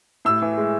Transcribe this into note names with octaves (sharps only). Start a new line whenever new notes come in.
A2 E6
E3
G#3